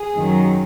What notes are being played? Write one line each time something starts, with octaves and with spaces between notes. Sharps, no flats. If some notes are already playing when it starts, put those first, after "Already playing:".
Already playing: G#4
F#2 D#3 F#3